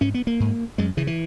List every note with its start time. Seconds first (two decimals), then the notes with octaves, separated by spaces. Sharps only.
0.01 G#2 C#4
0.14 B3
0.27 A#3
0.40 G#2
0.78 F#2 G#3
0.97 C#3 E3
1.07 E3